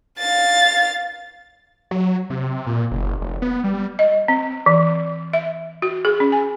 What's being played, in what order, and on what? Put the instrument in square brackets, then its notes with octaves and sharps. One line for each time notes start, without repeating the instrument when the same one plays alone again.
[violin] F5 A6
[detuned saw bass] F#3
C3
A#2
F#1
F1
B3
G3
[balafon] D#5
C4
E3
E5
F#4
G#4
C#4
G#5